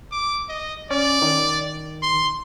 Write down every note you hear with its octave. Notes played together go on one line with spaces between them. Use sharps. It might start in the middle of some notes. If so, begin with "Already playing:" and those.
D6
D#5
C#4 D5
D#3
C6